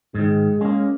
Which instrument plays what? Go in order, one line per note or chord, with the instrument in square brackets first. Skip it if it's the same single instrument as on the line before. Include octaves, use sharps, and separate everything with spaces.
[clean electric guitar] G#2 D#3 [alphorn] G#3
[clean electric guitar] G#3 A#3 [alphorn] C#4